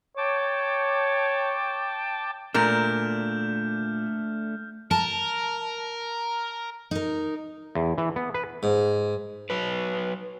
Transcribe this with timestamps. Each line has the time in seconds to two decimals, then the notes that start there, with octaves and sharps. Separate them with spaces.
0.17 C#5 G5 A5 D6
2.54 A#2 A3 D4 A#4 F6 G6
4.91 A#4 A5
6.91 D#4 A#4
7.75 E2
7.98 E3
8.16 B3
8.34 B4
8.63 G#2
9.50 F#3 B4